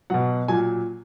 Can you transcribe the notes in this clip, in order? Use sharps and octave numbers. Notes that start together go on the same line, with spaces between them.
B2 F#3 F#5
A#2 F#3 G#5